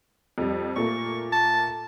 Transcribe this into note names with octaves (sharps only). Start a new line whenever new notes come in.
F2 G3
A#2 A3 A#3 C#6
A5